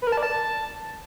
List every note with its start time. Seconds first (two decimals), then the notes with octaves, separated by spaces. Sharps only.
0.02 B4
0.07 A#4
0.12 A5
0.17 D5
0.23 A5